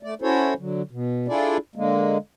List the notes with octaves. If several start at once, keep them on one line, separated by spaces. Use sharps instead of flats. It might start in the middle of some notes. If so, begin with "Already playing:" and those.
A3 D5
C#4 E4 F#4 A4 C5 C#5
D3 F#3
B2
D4 E4 F4 G#4 A4 D5
D3 G#3 A#3